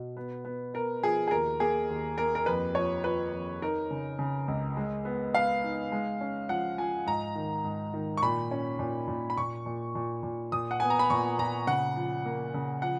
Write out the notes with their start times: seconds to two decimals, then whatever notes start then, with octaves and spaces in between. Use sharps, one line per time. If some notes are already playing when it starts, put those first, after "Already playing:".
Already playing: B2
0.17 B3
0.45 B3
0.74 B3 A#4
1.03 F3 G#4
1.28 G#4
1.31 D#2 A#4
1.60 A#3 G#4
1.89 D#2
2.18 A#3 A#4
2.35 A#4
2.46 F2 B4
2.75 F3 C#5
3.04 F3 B4
3.33 F2
3.62 D#4 A#4
3.91 C#3
4.19 C#3
4.48 C#2
4.77 G#3
5.05 B3
5.34 B3 F5
5.64 D#4
5.92 G#3
6.21 C#4
6.49 F3 F#5
6.78 F3 G#5
7.06 G#2 A#5
7.35 D#3
7.64 G#2
7.94 D#3
8.17 C#6
8.23 A#2 B5
8.51 C#4
8.79 A#2
9.08 A#2
9.30 B5
9.38 A#2 C#6
9.66 A#2
9.95 A#2
10.23 A#2
10.52 A#2 D#6
10.71 F#5
10.80 B3 G#5
10.90 A#5
10.99 B5
11.10 A#2 C#6
11.38 A#2 A#5
11.67 C#3 F#5
11.96 F3
12.25 A#3
12.54 C#3
12.82 F3 F#5